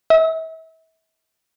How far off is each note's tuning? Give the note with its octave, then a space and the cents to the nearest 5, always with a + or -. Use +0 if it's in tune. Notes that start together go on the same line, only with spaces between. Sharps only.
E5 -35